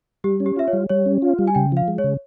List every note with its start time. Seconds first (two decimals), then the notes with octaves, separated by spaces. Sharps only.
0.24 G3 G4
0.40 C#4
0.46 G4
0.56 F4 E5
0.68 C#5
0.73 G3
0.89 G3 C#5
1.06 C#4
1.22 F4
1.39 G3
1.47 G#5
1.55 C#3 G5
1.72 F3 F5
1.88 G#3
1.98 C#5
2.04 C#3